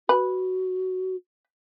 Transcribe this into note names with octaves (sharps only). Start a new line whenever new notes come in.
F#4 B4